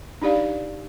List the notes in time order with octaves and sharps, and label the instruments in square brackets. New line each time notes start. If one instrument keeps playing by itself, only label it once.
[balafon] D4 D#4 G4 D5 F5